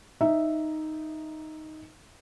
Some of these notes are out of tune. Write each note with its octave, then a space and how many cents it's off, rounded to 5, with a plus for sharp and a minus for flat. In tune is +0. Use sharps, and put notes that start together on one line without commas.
D#4 +0 E5 +0